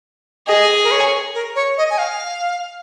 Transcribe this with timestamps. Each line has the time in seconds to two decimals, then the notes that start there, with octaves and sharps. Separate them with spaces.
0.47 G#4 D#5
0.84 A#4
0.91 C#5
1.34 A#4
1.55 C#5
1.78 D#5
1.90 G#5
1.98 F5